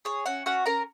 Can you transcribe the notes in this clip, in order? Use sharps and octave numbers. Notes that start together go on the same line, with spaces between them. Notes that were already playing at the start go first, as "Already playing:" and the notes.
G#4 C#5
C#4 F#4 F#5
C#4 F#4 F#5
C#4 A#4 A#5